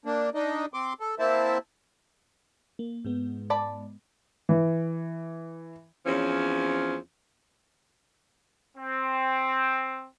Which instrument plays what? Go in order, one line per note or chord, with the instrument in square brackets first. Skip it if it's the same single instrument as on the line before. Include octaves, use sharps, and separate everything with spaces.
[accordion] A#3 D4
D4 D#4 D#5
C4 C6 D6
A4
A#3 C4 E4 C5 E5 A5
[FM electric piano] A#3
G#2 G#3 B3
[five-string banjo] D5 A5 B5
[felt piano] E3
[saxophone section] E2 F3 C4 C#4
[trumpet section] C4